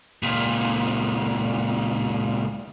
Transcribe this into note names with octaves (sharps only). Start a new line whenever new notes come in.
C#2 A#2